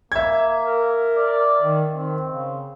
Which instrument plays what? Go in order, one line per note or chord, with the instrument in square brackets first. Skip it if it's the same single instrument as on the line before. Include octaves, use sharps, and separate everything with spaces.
[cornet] A#3 [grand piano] E5 G#6
[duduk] A#4
[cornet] D5
[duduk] D#3
[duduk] D#3 [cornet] C4
[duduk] C#3